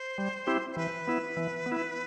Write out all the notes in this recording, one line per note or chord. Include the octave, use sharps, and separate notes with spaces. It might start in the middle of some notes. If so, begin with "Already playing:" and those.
Already playing: C5
G3
C4 E4 G4
C5
E3 B4
B3 E4
E3
B3
E4